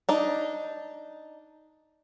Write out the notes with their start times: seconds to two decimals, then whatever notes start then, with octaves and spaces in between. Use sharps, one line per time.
0.09 D4 D#4